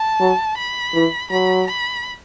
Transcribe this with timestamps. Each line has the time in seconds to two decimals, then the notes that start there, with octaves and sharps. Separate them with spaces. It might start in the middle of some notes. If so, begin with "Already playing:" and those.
Already playing: A5
0.20 F#3
0.58 B5
0.94 E3
1.31 F#3 B5
1.67 B5